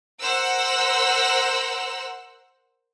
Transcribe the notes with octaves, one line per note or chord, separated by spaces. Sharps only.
A#4 C5 F#5 E6 F#6